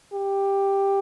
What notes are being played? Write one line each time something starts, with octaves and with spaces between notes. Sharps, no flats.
G4